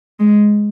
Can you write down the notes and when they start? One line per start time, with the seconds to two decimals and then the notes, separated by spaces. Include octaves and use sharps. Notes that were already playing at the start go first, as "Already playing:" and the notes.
0.20 G#3